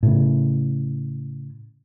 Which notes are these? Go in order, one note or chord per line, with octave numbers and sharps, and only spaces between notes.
A2 C#3